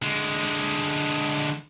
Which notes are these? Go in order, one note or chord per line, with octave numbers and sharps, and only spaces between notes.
D3 G#3